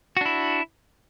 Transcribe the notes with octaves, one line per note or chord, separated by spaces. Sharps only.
D4 E4 F#4